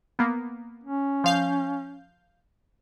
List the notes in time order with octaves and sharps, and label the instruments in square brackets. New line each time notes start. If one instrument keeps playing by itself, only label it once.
[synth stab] A#3 B3
[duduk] C#4
[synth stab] F3 F5 G6